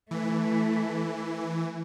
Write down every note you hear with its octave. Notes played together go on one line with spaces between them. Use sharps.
E3 A3